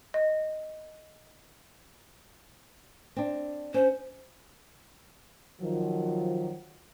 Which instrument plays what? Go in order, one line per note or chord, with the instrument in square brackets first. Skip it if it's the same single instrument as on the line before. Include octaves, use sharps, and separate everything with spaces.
[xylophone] D#5
[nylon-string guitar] C4 D4
[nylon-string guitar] C#4 [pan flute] C5
[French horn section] D#3 F3 F#3